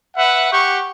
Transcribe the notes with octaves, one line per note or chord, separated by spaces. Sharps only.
B4 E5 F#5
G4 F#5 C#6